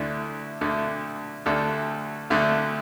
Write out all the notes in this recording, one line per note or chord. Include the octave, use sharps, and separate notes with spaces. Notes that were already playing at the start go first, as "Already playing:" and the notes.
Already playing: D2 D3 A3 E4
D2 D3 A3
D2 D3 A3 A4
D2 D3 A3